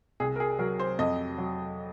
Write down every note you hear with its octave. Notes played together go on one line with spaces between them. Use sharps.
C2 G#4
A#4
G#4
F#3 A#4
C5
F2 D#5
F#3